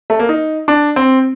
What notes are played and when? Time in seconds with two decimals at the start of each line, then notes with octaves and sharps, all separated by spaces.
0.10 A3
0.19 A#3
0.29 D#4
0.68 D4
0.96 C4